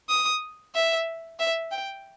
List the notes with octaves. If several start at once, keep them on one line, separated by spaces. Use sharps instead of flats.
D#6
E5
E5
G5